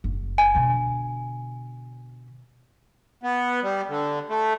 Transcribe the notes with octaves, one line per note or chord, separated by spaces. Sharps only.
F#1
G#5
B2 D3
B3
G3
D3
A3